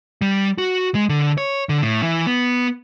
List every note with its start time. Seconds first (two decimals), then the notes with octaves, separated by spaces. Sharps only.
0.22 G3
0.58 F#4
0.95 G#3
1.09 D3
1.38 C#5
1.69 D3
1.82 A2
2.03 E3
2.27 B3